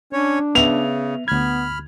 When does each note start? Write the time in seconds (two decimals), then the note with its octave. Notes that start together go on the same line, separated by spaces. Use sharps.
0.13 C#4 D4 C#5
0.55 C#3 B3 E5 F7
1.28 D2 B3 B5 F6 G#6